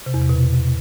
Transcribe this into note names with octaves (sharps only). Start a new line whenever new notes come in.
C3
E2
C3
B2